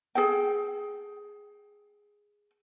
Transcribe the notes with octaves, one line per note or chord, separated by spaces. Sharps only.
G#4 A4 G5